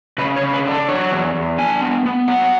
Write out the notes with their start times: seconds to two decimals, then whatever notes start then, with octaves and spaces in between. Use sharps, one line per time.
0.18 C#3 B4
0.36 C#5
0.41 C#3
0.53 B4
0.66 D4
0.71 A4
0.88 F#3 C#5
1.12 E2
1.34 E2
1.59 D4 G#5
1.82 B3
2.06 B3
2.28 F#3 F#5